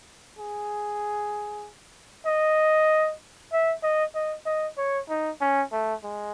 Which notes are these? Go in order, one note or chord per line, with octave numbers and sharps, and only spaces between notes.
G#4
D#5
E5
D#5
D#5
D#5
C#5
D#4
C#4
A3
G#3